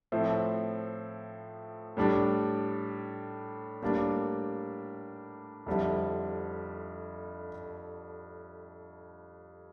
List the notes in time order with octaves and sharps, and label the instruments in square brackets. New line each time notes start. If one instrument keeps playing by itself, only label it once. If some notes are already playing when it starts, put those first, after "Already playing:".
[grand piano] A2 F3 C4 E4
A2 G3 D4
A2 G3 A#3 D4
F2 D3 G3 C4 E4